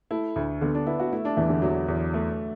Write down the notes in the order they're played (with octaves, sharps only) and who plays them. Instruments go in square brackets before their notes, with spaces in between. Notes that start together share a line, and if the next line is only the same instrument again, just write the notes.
[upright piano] A3 [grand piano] E4
[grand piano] D2
[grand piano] D3 [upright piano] B3
[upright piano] D4
[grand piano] B3 [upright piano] E4
[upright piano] F#4
[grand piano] A3 [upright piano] E4
[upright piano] D4
[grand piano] E2 [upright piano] E3
[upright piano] D3
[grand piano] E2 [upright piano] F#3
[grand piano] E2
A3